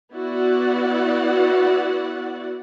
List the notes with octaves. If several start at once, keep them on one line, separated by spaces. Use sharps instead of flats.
B3 E4 F#4 D5 F#5